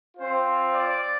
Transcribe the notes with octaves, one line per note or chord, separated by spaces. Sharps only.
C4 F4 C5
D5